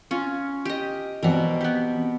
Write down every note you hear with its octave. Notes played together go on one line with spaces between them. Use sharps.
C#4 F4
G4 D#5
B2 E3 C4 A#4 D5
B3 G4